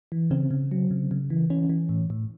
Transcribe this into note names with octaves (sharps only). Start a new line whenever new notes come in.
E3
C#3 C4
C#3
F#3
C#3
C#3
E3
E3 C#4
E3
A2
A2